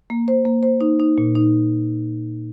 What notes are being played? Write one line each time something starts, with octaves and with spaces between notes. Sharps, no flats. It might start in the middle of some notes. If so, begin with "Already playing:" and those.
A#3
C5
A#3
C5
D#4
D#4
A#2
D#4